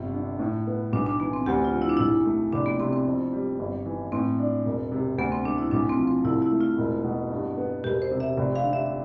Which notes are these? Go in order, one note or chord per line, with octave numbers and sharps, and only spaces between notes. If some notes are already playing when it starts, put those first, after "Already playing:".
Already playing: G1 C3 F4
D3
A2
B3
B1 D4
D4
E3 B3
C4
D2 G4
F4
F3
E4
D4
B1 E4
A3
F1 D4
B3
C3 C4
C4
F2
G3
G1
E3
A2 C4
D4
E1
C3
D2 B3
C4
A3 D4
E4
B1 D4
C4
F3
C4
C2 E4
E4
A3
F4
E1
B2
G2
B3
E1 G4
C5
C3
E5
F1
F5
D3
E5